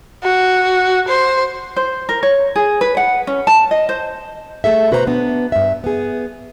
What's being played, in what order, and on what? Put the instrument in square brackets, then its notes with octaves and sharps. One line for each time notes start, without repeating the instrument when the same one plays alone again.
[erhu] F#4
C5
[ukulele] C5
A#4
C#5
G#4
B4
F#5
C#4
A5
D#5
C5
[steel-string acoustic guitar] A3 G#4 A4 E5
B2 F#4 B4 C5 D#5 A#5
B3 D4
G2 E5
B3 G#4